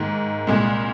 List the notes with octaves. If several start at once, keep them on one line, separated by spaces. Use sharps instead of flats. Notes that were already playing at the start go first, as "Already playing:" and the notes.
Already playing: G#2 D#3 A#3
C2 A#2 G#3